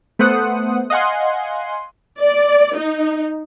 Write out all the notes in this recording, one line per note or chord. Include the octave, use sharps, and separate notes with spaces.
A3 B3 C5 F#5 D#6
D#5 F5 F#5 G#5 C6
D5
D#4